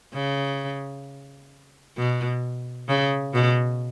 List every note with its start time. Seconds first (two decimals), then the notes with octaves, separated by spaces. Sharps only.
0.14 C#3
1.97 B2
2.88 C#3
3.34 B2